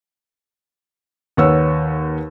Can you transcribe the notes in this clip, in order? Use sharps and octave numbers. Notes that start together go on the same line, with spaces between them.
D#2 B4 C#5 F#5 E6